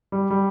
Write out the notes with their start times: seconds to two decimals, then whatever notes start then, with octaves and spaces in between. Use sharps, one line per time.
0.12 G3
0.30 G3